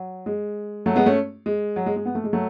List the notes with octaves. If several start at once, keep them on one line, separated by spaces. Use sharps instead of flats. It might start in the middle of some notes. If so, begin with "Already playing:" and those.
Already playing: F#3
G#3
F#3 A3
G#3 B3
A3 C#4
G#3
F#3
G#3
G#3
B3
A3
G#3
F#3 A3